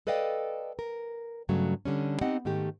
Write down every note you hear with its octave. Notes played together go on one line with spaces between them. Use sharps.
A4 B4 D5 D#5 F5 G5
A#4
G2 C#3 F#3 A3
D3 G3 C#4
B3 C4 D#4 G4 D#5 F#5
G#2 D#3 A3 G4